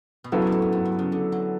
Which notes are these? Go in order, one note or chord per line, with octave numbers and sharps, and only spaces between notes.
B2
C#3 F#3 B3 E4 A4
B2
G2
A2
F#2
G2
G2
C#3
D3
F#3